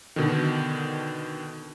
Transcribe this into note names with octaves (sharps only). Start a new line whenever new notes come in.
B2 D3 D#3